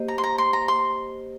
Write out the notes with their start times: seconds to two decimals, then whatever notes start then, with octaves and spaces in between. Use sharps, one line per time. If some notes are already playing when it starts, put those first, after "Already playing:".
Already playing: A#3 G4 C5 D#5
0.08 A#5
0.18 C6
0.24 A#5
0.38 C6
0.53 A#5
0.68 C6